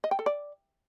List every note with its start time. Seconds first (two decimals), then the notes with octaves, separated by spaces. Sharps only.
0.04 D#5
0.11 G5
0.19 A4
0.26 D5